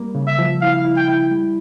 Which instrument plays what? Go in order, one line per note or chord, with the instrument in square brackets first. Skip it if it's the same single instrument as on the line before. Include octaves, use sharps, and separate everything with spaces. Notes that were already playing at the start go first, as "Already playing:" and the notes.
Already playing: [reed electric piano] G3 A#3
C#3
[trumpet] E5
[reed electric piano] F3
[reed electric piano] E4 [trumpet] F5
[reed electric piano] E4
[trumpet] G5
[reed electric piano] E4
G3